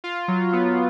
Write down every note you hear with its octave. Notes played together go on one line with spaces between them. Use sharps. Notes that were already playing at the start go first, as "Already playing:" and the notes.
F4
F#3
B3